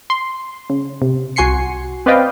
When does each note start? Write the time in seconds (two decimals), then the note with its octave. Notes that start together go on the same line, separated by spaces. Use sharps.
0.10 C6
0.70 C#3
1.02 C3
1.36 C2 F#4 G#5 C6 C7 C#7
2.06 C4 B4 D5 D#5 F5 G5